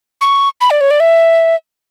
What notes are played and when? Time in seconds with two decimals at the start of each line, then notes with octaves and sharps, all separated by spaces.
0.21 C#6
0.61 B5
0.71 D5
0.81 C#5
0.91 D5
1.00 E5